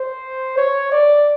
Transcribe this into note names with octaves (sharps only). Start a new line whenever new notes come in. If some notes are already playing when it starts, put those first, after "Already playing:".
Already playing: C5
C#5
D5